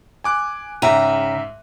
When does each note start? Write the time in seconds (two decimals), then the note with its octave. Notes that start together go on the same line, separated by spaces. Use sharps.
0.24 G#5 D6 F#6
0.82 G#2 C#3 E5 G5 A#5 D#7